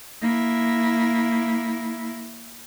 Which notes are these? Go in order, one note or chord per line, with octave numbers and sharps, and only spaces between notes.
A#3 E4